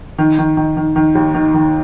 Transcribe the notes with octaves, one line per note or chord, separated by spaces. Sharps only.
D#3
D#3
D#3
D#3
D#3
D#2
D#3
D#3